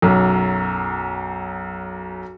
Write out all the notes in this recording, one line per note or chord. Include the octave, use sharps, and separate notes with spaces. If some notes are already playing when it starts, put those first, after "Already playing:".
B1 F#2